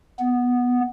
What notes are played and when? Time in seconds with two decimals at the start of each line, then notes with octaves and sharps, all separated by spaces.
0.19 B3